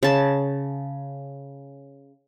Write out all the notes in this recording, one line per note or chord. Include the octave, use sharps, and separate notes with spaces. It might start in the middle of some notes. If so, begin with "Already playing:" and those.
C#3 A5